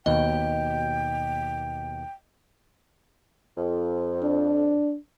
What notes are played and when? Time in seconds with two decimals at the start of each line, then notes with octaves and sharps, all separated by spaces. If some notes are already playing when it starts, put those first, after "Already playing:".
0.06 D#2 B2 D#5 G5
3.57 F2
4.23 D4